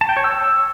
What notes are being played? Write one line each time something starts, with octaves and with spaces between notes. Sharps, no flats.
A5
G5
C#5
E6